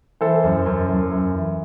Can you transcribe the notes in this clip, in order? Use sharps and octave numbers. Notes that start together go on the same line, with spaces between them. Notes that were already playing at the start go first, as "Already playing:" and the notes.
E3 A4 C5
F#2
F#2
F#2
F#2
E3